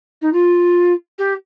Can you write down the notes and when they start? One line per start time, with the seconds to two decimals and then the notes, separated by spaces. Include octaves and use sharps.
0.21 D#4
0.33 F4
1.18 G4